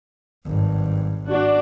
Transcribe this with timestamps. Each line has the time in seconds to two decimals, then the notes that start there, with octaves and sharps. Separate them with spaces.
0.46 G#1 G2
1.28 D4 F#4